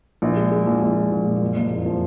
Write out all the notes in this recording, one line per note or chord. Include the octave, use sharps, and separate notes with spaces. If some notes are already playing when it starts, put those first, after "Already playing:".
A#1
G#3
G#3
A#1
A#1
G#3
A#1
A#2
F#1
F#1
F2
F3